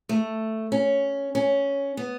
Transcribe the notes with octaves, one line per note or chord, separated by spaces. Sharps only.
A3
C#4
C#4
B3